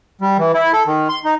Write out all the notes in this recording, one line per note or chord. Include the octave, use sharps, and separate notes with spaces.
G3
E3
E4
A4
D#3
C6
D#4